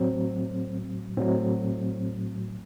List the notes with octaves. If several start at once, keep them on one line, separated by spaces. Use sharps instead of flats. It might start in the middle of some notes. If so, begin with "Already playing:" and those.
Already playing: A2 F#3 C4
A2 F#3 C4